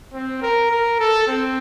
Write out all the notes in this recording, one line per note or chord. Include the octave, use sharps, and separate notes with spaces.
C4
A#4
A#4
A4
C4